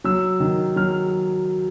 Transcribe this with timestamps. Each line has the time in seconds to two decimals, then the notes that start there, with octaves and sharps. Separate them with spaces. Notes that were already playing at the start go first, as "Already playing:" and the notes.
0.04 F#3 E6
0.40 D#3
0.76 F#3 F6